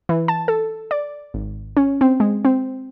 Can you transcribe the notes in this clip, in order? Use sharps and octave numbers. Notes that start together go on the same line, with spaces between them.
E3
A5
A4
D5
G#1
C#4
C4
G#3
C4